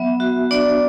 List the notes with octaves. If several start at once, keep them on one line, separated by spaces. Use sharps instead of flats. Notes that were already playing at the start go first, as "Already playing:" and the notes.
Already playing: F#3 B3 E5
F#4
D4 D5